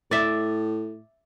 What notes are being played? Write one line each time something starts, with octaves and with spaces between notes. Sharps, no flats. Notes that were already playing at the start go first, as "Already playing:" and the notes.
A2 D5 E5